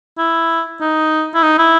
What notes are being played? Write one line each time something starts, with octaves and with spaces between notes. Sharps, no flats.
E4
D#4
E4
D#4
E4